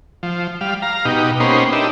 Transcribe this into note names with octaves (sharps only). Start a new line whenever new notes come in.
F3
G3 F5
F5 A#5
B2 D#4 G4
A#3 B3 C#4 D#4 G4 C5
D4 D#4 G4 E5